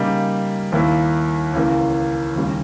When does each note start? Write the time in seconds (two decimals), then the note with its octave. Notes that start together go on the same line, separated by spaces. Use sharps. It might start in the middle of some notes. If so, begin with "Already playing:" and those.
Already playing: C#3 G3 A#3 D#4
0.72 D#2 D#3 A#3 E4
1.53 C#2 C#3 E3 A#3
2.36 D#2 C#3 G3